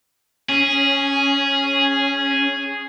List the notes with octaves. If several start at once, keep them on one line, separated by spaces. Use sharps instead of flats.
C#4 G#4